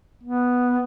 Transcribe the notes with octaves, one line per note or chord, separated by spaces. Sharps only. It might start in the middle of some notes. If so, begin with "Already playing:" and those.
B3